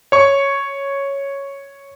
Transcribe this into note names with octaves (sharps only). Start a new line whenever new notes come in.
C#5 C#6